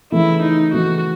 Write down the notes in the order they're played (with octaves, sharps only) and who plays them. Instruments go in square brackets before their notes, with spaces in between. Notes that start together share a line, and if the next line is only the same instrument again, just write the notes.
[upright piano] C#3 E3 A3 [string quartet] E4
[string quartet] D#4
[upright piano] C#3 E3 A3 [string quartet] F#4